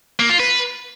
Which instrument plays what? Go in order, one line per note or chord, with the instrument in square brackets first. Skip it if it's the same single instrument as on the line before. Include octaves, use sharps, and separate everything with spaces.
[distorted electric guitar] A#3
F4
B4